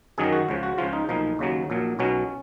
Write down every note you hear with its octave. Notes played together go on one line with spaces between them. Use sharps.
F#2 D#3 F#3 G#4
F#4
C#2 C#3 F3
F#4
C#2 C#3 F3 F4
D#4
B1 A#2 F3 D#4
D#2 C#3 F#3
A#1 A#2 F#3
B1 B2 F#3 C#4